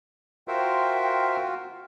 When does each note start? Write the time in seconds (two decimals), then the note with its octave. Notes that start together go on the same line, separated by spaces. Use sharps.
0.48 F4 F#4 A#4 C5 E5 G5